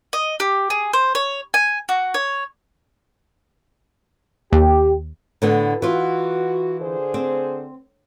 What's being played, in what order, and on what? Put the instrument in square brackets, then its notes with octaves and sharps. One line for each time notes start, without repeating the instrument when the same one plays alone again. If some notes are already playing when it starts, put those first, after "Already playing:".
[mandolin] D#5
G4
G#4
C5
C#5
G#5
F#4
C#5
[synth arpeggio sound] D#2 [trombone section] G4
[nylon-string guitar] A2 D3 B3
[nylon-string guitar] E3 F4 [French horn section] F#4
[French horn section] D3 G#4 C5
[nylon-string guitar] C4